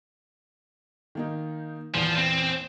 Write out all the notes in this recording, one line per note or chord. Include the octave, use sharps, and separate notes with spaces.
D#3 A#3 D#4
E2 A#2 E3 F3
C4